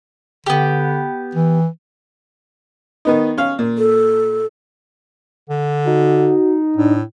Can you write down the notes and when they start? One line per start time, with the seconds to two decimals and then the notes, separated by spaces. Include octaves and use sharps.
0.46 D3 B3 G4
1.35 E3
3.05 D#3 B3 D#4
3.38 C#4 F5
3.59 A#2
3.78 A4
5.50 D3
5.87 D#4 F#4
6.77 A2 D4